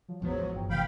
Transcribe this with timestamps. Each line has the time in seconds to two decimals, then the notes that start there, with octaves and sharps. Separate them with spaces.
0.09 F3 F#3
0.22 A1 E2 G#2 F3 F#3 B3
0.53 G1 G2 G5
0.70 D1 D2 C3 E3 F3 F5 G5 B5